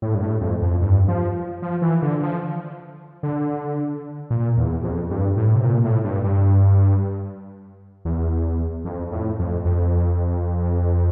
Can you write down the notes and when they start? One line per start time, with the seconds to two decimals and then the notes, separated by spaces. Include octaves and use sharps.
0.02 A2
0.15 G2
0.22 A2
0.41 F2
0.62 F2
0.82 G2
1.08 F3
1.62 F3
1.82 E3
2.02 D3
2.23 F3
3.23 D3
4.30 A#2
4.57 E2
4.83 F2
5.10 G2
5.37 A2
5.55 C3
5.64 A#2
5.85 A2
6.05 G2
6.24 G2
8.05 E2
8.85 F2
9.12 A2
9.39 F2
9.65 F2